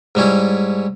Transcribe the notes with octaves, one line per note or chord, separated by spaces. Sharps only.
G#2 G3 C#4 E4